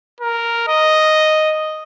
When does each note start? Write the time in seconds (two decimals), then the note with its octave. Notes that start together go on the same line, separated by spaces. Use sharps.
0.21 A#4
0.68 D#5